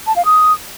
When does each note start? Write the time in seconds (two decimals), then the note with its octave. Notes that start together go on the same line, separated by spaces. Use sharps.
0.07 A5
0.16 F5
0.25 D#6